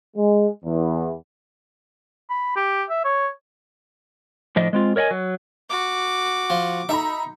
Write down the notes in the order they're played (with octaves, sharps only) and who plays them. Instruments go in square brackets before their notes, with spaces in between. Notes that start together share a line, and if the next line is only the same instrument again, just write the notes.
[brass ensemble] G#3
E2
[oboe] B5
G4
E5
C#5
[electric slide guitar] A2 F3 D4 D#5
G#3 C4 F4
A#4 C#5 D#5 G5 G#5
F#3
[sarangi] F#4 [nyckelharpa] D6
[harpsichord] F3
[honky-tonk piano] D#4 A#5 B5 [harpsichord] E5